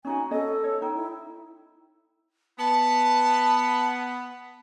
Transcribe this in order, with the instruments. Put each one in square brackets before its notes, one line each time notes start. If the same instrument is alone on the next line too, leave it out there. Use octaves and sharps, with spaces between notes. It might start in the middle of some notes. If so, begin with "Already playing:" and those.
[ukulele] C#4 D#4 F#4 [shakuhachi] G#5
[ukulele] C#4 D#5 [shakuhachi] A4
[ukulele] C#5
[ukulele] D#4 [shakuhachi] G5
[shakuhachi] E4
[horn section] B3 [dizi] A5